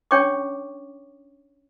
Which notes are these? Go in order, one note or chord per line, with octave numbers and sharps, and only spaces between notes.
C#4 D4 C#5 G5 C#6 D6